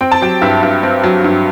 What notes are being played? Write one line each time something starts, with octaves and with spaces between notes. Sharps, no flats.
C4 G5
A5
F#3 G4 G5
G2 E4 E5
G2
C4
F#3
G2